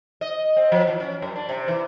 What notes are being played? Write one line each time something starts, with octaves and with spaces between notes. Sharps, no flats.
D#5
C4
F3
E3
C#4
F#2
D4
C3
E3